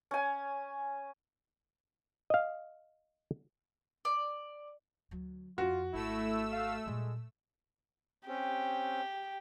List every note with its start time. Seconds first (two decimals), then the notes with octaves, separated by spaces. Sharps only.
0.11 C#4 G#5
2.30 D#5 F5
4.05 D5
5.11 D2 F#3
5.58 F2 F4 F#4
5.94 G#1 A3 E4 E6
6.52 F5
6.86 A#2 G3 G#3
8.28 C4 C#4 G4